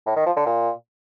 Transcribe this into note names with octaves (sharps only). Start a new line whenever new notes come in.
A2
D#3
F3
D3
A#2